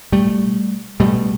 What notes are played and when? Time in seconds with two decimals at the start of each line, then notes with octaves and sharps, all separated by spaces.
0.12 B2 G3 A3
1.00 B2 G3 A3